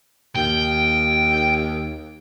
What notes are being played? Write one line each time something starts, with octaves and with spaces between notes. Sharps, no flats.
D#2 G5